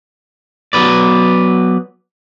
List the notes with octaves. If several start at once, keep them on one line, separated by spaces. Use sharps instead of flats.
F#3 B3 B4 D5